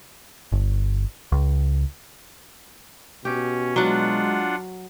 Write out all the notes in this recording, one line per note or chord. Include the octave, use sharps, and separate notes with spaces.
G1
C#2
B2 C#4 G4
F#3 G#3 D4 F4 F#4 F#5